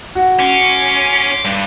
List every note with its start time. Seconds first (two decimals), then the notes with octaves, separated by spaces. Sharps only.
0.15 F#4
0.39 C#4 C6 D6
1.45 G2